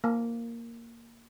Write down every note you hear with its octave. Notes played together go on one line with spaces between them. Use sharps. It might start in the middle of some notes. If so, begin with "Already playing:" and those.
A#3